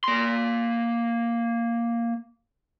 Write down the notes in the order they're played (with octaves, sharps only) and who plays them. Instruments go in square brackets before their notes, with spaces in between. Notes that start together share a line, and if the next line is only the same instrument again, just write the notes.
[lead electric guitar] A#3 C6